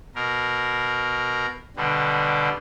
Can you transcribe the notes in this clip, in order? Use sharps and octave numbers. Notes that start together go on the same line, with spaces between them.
B2 A#4
B2 D3 G3